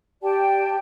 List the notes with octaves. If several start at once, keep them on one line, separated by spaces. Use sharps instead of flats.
G4 D5 G5 A5